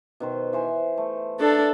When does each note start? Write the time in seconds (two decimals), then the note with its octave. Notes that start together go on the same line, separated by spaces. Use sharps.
0.20 B2 D#3 C5
0.53 E3 C5 G#5
0.97 A3
1.39 D4 A4